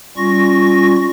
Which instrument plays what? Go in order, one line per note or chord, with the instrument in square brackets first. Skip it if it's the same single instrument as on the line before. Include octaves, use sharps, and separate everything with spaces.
[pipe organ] G3 C#4 F4 C#6 A#6